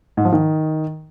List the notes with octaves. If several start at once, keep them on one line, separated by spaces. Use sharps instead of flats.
G#2
F3
D#3